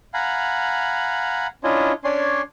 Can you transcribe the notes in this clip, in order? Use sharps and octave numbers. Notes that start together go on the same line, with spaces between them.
F5 F#5 G#5 A#5 B5
C#4 D4 E4 F4 C#5 D#5
C#4 D4 C#5 D5 G#5 C6